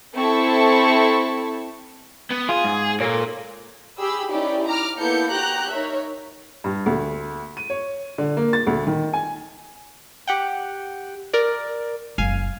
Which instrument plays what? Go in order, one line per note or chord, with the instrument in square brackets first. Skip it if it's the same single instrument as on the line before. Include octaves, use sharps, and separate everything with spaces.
[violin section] C4 E4 A4 A5 C#6
[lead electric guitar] B3
[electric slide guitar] F4 [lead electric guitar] G#4
[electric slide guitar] G#2
[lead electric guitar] A#2 [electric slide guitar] A4 A#4 C#5
[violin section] G4 G#4 B5 E6
C#4 D#4 E4 G4 B4 D5
A#5 D6 F6
A#3 B3 E4 A4 G6 C#7
F#4 G4 A#5 F#6 G6
D#4 A#4 C#5 E5
[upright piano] G2
D2
D#7
C#5
D3
A#3
A6
D2
D#3
G#5
[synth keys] G4 F#5 G5
A#4 D5
[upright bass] F#1 [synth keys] F5 G#5